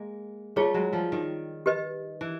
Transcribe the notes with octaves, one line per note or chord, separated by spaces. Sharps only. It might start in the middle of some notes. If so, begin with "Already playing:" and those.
Already playing: G#3 A#3
G3 A3 F4 G#4 C#5
F#3 G#3
F3 G3
D#3
G4 B4 D#5
E3